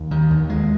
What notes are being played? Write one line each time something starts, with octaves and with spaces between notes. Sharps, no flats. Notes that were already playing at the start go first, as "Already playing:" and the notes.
Already playing: D#2
D#3
D#2
G#3